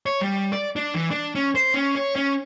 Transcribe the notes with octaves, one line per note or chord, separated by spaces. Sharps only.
C#5
G3
D5
D4
E3
D4
C#4
C5
C#4
C#5
C#4